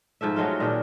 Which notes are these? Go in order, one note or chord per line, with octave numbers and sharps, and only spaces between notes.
G#2 F3 A4 E5
F#3 G#3 A3 F4
A#2 D#3 D4